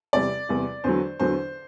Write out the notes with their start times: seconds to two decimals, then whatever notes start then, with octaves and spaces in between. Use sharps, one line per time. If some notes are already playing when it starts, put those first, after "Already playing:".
0.13 E2 C3 G3 D5
0.49 E2 C3 G3
0.84 E2 D3 F#3 C5
1.20 E2 D3 F#3 C5